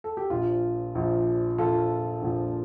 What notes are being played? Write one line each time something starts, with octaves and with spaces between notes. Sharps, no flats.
A4
G4
A#1 A#2 F3 F4
A#1 A#2 F3
A#1 A#2 F3 F4 A4
A#1 A#2 F3